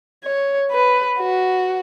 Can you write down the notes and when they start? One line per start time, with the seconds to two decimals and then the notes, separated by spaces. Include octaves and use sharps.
0.24 C#5
0.71 B4
1.19 F#4